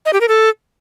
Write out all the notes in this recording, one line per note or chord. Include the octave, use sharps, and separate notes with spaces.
D#5
G4
A#4
A4